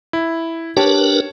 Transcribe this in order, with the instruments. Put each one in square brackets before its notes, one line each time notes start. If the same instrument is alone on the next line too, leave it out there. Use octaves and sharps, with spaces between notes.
[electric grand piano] E4
[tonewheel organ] D4 A#4 B4 [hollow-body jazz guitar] G4 [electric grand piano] C#5 A5